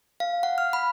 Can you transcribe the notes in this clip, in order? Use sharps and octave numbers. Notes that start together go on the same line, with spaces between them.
F5
F#5
F6
B5